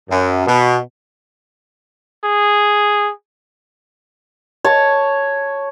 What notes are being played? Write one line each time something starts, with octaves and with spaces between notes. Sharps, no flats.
F#2
B2
G#4
C#5 A5